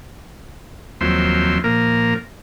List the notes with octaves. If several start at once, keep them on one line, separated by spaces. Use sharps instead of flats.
D#2 F3 F#3 C4 E5 C6
A#2 F3 A#3 A#4